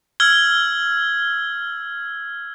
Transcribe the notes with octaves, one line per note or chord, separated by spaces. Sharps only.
E6 F6 G#6 G7